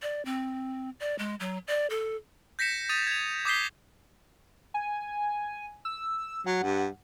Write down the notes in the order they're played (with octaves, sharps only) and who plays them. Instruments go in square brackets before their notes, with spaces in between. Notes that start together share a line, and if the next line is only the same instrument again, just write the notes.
[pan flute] D5
C4
D5
G#3
F#3
D5
A4
[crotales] G6 A#6 B6 C#7 E7
D#6 A6 D#7 F7
G#6 F7
D6 D#6 G6 B6 C7 G7
[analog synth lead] G#5
E6
[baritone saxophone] F#3 [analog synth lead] F#5
[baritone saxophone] G2